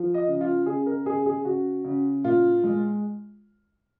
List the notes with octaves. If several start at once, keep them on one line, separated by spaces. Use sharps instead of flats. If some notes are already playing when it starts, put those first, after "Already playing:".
Already playing: F3
D#5
C#3
F4
C#3 G#4
A#4
C#3 G#4
G#4
C#3 F#4
C#3
A#2 F4
G#3